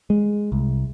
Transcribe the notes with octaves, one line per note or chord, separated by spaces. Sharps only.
G#3
C2